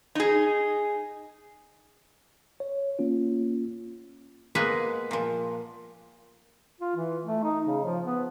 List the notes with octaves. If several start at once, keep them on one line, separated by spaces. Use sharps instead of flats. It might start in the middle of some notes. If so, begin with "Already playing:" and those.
D#4 G#4
C#5
A#3 C#4 F4
G#3 A#3 B3 G#4 B4
A#2 F3
F4
E3
A3
D#4
C#3
F3
B3